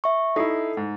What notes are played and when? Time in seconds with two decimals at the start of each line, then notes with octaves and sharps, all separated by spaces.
0.04 E5 C#6
0.36 D#4 E4 A4 C7
0.77 G#2